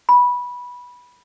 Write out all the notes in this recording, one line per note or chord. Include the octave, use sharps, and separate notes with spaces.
B5